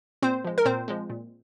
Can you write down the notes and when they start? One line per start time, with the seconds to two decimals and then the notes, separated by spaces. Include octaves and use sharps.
0.22 A#2 C4 C5
0.45 F3 G#3
0.58 A#4
0.65 A#2 C4 C5
0.88 F3 G#3
1.10 A#2